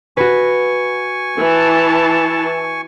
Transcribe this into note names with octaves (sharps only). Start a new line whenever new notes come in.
F#4 B4 G#5 C#6
E3 A5